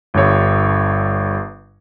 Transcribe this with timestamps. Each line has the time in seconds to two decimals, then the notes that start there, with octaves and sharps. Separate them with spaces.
0.14 G1 G2 C#5